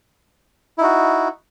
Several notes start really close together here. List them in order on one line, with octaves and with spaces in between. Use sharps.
E4 D#4 F#4